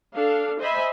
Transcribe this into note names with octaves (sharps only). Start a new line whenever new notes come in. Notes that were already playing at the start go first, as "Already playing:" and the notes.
D4 A4 F5
C5 D#5 E5 G#5 B5